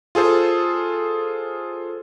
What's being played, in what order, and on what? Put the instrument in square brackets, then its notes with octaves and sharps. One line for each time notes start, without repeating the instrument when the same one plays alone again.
[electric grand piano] F4 G#4 A4 C5